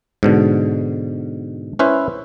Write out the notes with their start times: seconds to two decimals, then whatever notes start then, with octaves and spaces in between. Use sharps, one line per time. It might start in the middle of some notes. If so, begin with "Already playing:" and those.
0.23 G#2 B2 D3
1.79 C#4 E4 B4 C5 E5